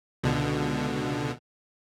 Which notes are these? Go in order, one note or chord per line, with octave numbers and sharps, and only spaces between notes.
C#2 B2 D3